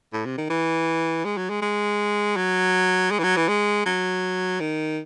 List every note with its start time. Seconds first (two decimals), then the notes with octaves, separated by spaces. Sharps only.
0.13 A2
0.25 C3
0.38 D#3
0.50 E3
1.25 G#3
1.37 F#3
1.50 G#3
1.62 G#3
2.36 F#3
3.11 G#3
3.19 E3
3.23 F#3
3.36 E3
3.48 G#3
3.86 F#3
4.60 D#3